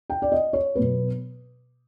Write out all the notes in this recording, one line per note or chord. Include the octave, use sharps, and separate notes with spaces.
G5
D5
D#5
C#5
B2 F#3 B3 B4